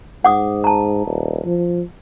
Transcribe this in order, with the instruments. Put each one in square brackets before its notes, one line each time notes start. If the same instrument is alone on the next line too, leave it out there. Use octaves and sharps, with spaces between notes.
[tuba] G#2 [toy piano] F#5 D6 D#6
[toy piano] A5 A#5
[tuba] D#1
F3